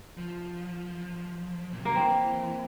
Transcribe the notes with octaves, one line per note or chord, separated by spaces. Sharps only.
F3
A#2
C3
D3 A#3
E3 C4